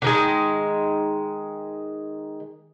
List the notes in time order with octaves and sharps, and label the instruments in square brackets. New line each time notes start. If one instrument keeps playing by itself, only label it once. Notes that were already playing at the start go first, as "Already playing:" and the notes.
[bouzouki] D3 D#3 G#3